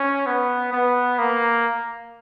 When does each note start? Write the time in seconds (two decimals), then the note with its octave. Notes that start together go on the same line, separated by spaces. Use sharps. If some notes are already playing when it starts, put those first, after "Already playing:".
Already playing: C#4
0.26 B3
0.72 B3
1.19 A#3